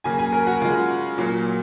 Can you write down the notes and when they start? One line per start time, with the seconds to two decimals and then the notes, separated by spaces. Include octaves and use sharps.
0.04 C#3 F#3 A#3 G#5
0.19 G#5
0.33 A#4
0.47 F#4
0.61 C#3 G#3 F4
1.18 A#2 F#3 A#3